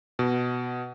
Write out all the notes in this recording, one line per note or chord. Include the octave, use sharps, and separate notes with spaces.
B2